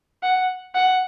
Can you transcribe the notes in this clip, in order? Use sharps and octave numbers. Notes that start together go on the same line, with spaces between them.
F#5
F#5